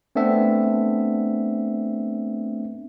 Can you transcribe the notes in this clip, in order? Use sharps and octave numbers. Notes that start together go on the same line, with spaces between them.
A3 B3 C4 D4 E5